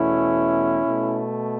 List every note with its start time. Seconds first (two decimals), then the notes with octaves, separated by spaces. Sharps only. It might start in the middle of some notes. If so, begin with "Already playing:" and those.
Already playing: E2 B2 A3 C#4 E4
0.85 B2 A3